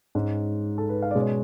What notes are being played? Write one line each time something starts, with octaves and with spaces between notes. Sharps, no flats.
G#2 G#3 C#4
A4
B4
F5
B2 G#3 C#4 D5
C#5